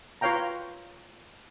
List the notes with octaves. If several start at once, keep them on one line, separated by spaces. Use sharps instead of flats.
F4 B4 C#5 F5 G5 A#5